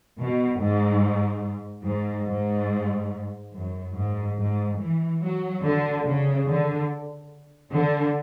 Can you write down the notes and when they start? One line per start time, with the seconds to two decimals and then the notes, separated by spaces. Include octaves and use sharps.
0.18 B2
0.60 G#2
1.85 G#2
2.28 G#2
3.54 F#2
3.96 G#2
4.38 G#2
4.79 E3
5.22 F#3
5.63 D3
6.06 C#3
6.47 D3
7.73 D3